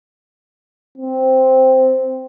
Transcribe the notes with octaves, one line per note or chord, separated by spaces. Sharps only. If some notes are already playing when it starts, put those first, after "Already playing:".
C4